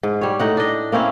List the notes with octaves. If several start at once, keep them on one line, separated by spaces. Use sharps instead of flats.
G#2
G3 C#5
A2 D#4 F#5
D4 D#5
A#3 C4 C#4 E4